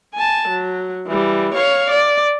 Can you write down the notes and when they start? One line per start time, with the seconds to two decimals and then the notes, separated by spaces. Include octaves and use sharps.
0.14 G#5 A5
0.49 F#3
1.08 E3 G3
1.54 C#5 F5
1.90 D5